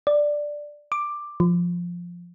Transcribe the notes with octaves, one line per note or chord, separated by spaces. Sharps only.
D5
D6
F3